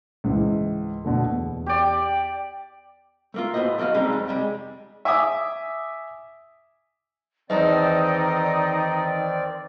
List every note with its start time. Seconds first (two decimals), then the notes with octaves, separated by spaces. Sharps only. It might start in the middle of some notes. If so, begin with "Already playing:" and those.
0.24 C#2 G#2 E3
1.05 B2 D3 A3
1.31 E2
1.66 G4 D5
3.34 A3 A#3 F4
3.54 C#2 A2 B3 F#4 C5 D#5
3.78 F3 A#3 F#4 D#5 F5
3.94 G3 G#3 C4 C#4 D#4 A4
4.12 F2
4.28 C3 G3 G#3
5.05 E5 G#5 D6 D#6
7.50 E2 D#3 C4 D#4 D5 D#5 A5